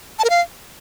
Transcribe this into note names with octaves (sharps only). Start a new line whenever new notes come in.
A5
A#4
F5